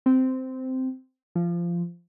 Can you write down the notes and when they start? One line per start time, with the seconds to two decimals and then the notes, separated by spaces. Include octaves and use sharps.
0.06 C4
1.35 F3